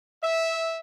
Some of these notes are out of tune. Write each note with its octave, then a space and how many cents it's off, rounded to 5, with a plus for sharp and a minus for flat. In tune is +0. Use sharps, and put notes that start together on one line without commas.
E5 -10